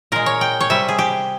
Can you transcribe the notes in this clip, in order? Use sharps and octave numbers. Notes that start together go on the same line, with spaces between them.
A#2 G#3 A#4
C#5
G5
C#5
C3 G3 E5
G#4
G4